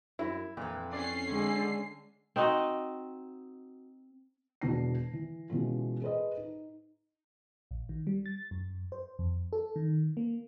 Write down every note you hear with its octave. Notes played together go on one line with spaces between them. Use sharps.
F#2 E4
F2 A#2 E3
C#4 D5 C7
D3 G#3
C4 D#4 F#4 D#5
E1 B2 E3 D4 A#6 C7
E3
B2 E3 G#3 C#4 F4
G#4 A4 B4 C5 D#5
D#4
A#1
D#3
G3
A6
F#2
C5
F2
A4
D#3
A#3